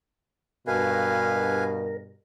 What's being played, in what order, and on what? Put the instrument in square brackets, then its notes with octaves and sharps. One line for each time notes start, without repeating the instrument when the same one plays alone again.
[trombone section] G2 B2 [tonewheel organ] A#4 [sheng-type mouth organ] B4 F5 G#5